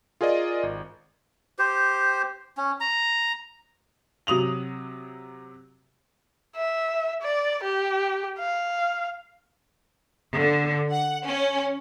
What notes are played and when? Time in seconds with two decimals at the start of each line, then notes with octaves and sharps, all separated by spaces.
0.21 F4 G#4 A#4 D5 D#5
0.63 G#1
1.59 G4 C5
2.57 C#4
2.80 A#5
4.27 C3 F#3 D#6 F7 F#7
6.56 E5
7.22 D5
7.64 G4
8.39 F5
10.37 D3
10.92 F#5
11.27 C#4